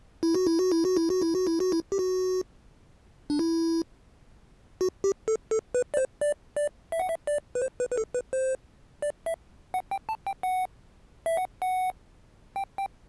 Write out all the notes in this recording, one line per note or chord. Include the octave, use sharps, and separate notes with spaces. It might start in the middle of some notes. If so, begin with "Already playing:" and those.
E4
F#4
E4
F#4
E4
F#4
E4
F#4
E4
F#4
E4
F#4
E4
G4
F#4
D4
E4
F#4
G4
A4
A4
B4
D5
C5
D5
D5
E5
F#5
E5
D5
B4
C5
B4
B4
A4
B4
C5
D5
E5
F#5
G5
A5
G5
F#5
E5
F#5
F#5
G5
G5